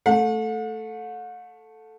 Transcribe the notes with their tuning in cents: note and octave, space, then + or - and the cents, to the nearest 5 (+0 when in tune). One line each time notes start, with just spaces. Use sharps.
A3 +0 F#5 -45